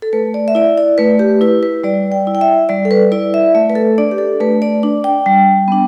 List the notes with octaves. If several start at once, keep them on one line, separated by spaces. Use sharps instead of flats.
A4
A3 B4
D5
E5
E4 D5
D5
A3 B4
G4
E4 B4
B4
G3 D5
G5
E4
G5
E5
G3 D5
A4
B4
E4 D5
E5
A3 E5
B4
A4
D4 D5
G4
A4
A3 B4
D5
D4
G5
G3
B3 D4